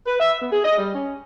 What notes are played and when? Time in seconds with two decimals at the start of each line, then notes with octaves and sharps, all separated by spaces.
0.06 B4
0.20 E5
0.41 B3
0.52 G#4
0.64 D#5
0.78 G3
0.93 C#4